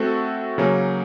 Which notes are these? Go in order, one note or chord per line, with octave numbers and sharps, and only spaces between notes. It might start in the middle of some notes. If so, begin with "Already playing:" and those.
Already playing: A3 C4 F#4 A4
C#3 F#3 A#3 C#4